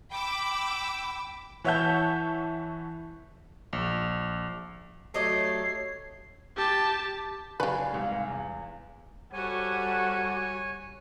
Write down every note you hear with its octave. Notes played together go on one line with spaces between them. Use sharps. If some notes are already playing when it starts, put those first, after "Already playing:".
G5 B5 D6 E6
E3 C#5 E5 F#5 A5 G6
A#1
F#3 A3 G4 C#5 D#5 C7
G4 A5
F#1 D4 G4 B4 F5 G#5 C#6
C2 G#2
E2
G3 F#4 A4 C5 C#5 F#5 G#5